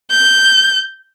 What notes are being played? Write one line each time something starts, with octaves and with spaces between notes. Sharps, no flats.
G6